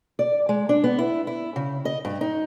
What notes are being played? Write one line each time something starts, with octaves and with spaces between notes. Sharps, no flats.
D5
G#3
D4
B3
E4
E4
C#3
D#5
G2
D#4